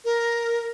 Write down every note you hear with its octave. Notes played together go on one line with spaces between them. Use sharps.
A#4